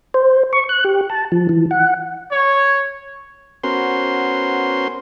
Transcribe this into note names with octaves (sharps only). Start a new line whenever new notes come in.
C5
C#6
F#6
G4
A5
F3
E3
F#5
C#5
B3 C#4 F#4 A#4 C5 C6